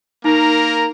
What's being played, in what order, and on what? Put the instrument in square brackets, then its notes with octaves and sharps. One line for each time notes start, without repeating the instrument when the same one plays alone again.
[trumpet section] A#3 A#4 A#5 [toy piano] D#4